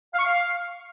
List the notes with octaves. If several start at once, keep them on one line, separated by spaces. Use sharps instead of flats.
F5
C#6
F5